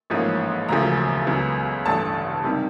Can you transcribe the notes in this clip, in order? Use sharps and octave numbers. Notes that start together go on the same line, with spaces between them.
A1 G#2 F3 A#3 C#4
E1 D2 C#3 F3 A#5
C#2 C#3 F#3 B3
A1 G2 D3 A5
C3 D#3 G3